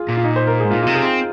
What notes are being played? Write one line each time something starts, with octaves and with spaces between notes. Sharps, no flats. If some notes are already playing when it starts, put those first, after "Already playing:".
Already playing: F4 G#4
A#2
F4
D#4
C5
A#4
G#4
G#2
A#2 F4
F4
C3
G#4
C4